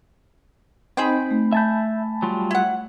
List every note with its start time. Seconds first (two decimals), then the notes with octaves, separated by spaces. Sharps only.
0.97 C4 D#4 G#4 C5 G5 B5
1.31 A3
1.53 E5 G#5 A5 B5 G6
2.22 F#3 G3 F4
2.51 E4 F#5